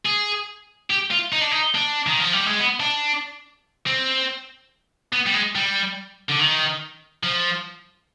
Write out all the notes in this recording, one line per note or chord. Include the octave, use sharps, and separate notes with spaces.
G#4
G4
F4
D#4
D4
D#4
D4
D#3
F3
G3
G#3
B3
D4
C4
B3
G3
G#3
G3
D3
D#3
F3